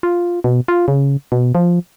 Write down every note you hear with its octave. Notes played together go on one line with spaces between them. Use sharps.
F4
B2
F4
C#3
B2
F3